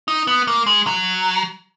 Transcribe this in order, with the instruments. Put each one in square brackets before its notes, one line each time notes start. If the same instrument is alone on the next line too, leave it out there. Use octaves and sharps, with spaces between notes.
[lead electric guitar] D#4
B3
A#3
G#3
F#3